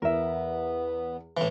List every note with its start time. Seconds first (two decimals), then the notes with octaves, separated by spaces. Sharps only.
0.02 E2 B3 A#4 E5
1.37 A2 E3